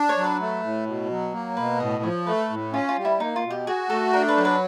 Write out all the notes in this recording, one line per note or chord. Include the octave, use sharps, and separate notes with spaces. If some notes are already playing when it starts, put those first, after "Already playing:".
Already playing: D4
C#5
F#3
B4
A3
A2
B2
F#3
A#3
B2 B4
A2 D#5
F3 C#5
A3 B4
A2
C#4 F4
F4
G3
E4
A#3 D#4
F4
B2
G4
F#4 G#4
A3 A4
D4 A#4
B4
F#3
B4